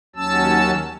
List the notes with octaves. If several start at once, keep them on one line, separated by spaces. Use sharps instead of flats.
D#2 F#3 C#4 A5 E6